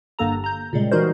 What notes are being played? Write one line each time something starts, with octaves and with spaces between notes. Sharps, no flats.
G1 G2 A#3 A4 A#5
A#5 G6
A#2 C#3 G3 G#3
E3 G3 D#4 F#4 A#4 C5